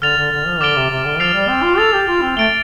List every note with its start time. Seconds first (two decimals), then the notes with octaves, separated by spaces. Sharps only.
0.02 D3 F6 A6 F7
0.17 D3
0.32 D3
0.47 F3
0.61 D3 D6 F6 A6 D7 G7
0.76 C3
0.90 C3
1.05 D3
1.19 F3 F6 A6 C7 F7
1.34 G3
1.49 C4
1.63 F4
1.78 A4 A6 F7
1.93 G4
2.08 F4
2.22 C4
2.37 A3 A6 D7 G7